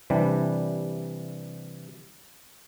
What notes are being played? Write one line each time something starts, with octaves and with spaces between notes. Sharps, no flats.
C3 E3 G3 D4